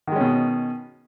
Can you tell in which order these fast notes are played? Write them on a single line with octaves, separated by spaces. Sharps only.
D#3 G#3 C#4 B2